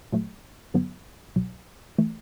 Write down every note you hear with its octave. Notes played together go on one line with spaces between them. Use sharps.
A#2 F#3 A3
G2 D3 F#3 B3
C2 B2 F#3
E3 A3